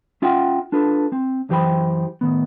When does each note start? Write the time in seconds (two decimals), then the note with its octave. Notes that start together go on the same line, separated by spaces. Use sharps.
0.22 C#4 F4 E5 F#5 G5
0.72 D4 F4 A4 B4
1.12 C4
1.49 F#2 E3 G4 C5 G5 B5
2.21 A2 D#3 B3